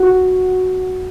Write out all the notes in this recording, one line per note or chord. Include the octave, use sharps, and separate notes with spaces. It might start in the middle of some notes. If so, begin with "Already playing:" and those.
Already playing: F#4